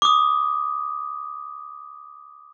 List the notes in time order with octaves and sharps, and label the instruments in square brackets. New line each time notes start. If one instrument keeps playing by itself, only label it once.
[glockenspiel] D6 D#6